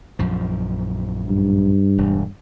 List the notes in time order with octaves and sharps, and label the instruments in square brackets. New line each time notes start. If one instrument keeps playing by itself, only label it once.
[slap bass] A#1 F#2 F3
[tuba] G2
[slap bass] E1